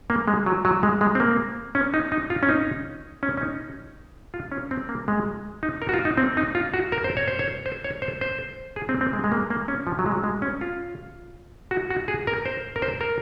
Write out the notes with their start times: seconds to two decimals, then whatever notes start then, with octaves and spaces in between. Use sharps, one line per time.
0.10 A#3
0.28 G#3
0.46 F#3
0.65 F#3
0.83 G#3
1.01 G#3
1.15 C4
1.20 A#3
1.75 C#4
1.94 D#4
2.12 D#4
2.30 F4
2.43 C#4
2.49 D#4
3.23 C#4
3.37 C#4
3.41 D#4
4.34 F4
4.52 C#4
4.71 C4
4.89 A#3
5.08 G#3
5.63 D#4
5.82 A#4
5.89 F#4
5.94 F4
6.05 D#4
6.18 C4
6.37 D#4
6.55 F4
6.74 F#4
6.92 A#4
7.04 C5
7.17 C#5
7.28 C5
7.39 C#5
7.66 C5
7.84 C#5
8.02 C5
8.21 C5
8.76 G#4
8.89 C4
9.01 C4
9.13 G#3
9.24 G#3
9.32 A#3
9.50 A#3
9.68 C#4
9.87 F3
9.99 F#3
10.06 G#3
10.12 F#3
10.24 G#3
10.42 C#4
10.61 F4
11.71 F#4
11.90 F#4
12.08 G#4
12.27 A#4
12.45 C5
12.76 A#4
12.82 C5
13.01 A#4